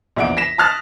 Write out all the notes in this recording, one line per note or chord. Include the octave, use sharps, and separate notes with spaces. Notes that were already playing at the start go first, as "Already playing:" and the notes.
A#1 E2 E5 F#5 D7
A#6 B6 E7
A5 D#6 F6 F#6 A6